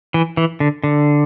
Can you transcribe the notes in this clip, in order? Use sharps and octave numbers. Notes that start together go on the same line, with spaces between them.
E3
E3
D3
D3